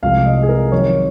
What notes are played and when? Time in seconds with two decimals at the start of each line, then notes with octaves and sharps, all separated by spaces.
0.02 C2 C3 F3 G#3 F5
0.25 D#5
0.43 G#4
0.49 A#4
0.72 F2 D#3 F#3 C#5